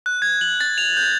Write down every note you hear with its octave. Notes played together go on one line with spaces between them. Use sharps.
F#6
G#6
F#7
A6
F7
G6